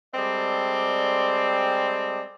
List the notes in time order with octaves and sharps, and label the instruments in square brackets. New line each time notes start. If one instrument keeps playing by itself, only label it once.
[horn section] G3 G#3 C4 A4 D5